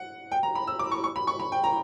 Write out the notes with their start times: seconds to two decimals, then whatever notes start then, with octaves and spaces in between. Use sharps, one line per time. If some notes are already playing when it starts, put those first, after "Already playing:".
Already playing: F#5
0.32 G5
0.43 A#5
0.55 B5
0.67 E6
0.79 D6
0.91 C#6
1.04 C#6
1.16 B5
1.27 C#6
1.40 B5
1.52 G5
1.64 A#5